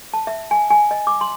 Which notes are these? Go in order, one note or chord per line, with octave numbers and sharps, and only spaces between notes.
A5
E5
G#5
G#5
D#5
D6
C6